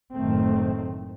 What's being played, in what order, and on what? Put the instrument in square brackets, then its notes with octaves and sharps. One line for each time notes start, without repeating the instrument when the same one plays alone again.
[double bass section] F#1 A2 D#3 A3 C4